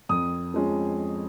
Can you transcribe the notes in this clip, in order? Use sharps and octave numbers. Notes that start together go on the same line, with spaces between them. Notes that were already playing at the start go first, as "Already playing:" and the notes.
F2 D#6
F3 G#3 C#4